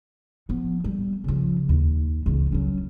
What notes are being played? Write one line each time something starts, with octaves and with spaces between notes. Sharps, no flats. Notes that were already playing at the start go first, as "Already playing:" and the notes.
F3 B3
G3
C#3 F3
D#2
C#2 E3
F#3 C#4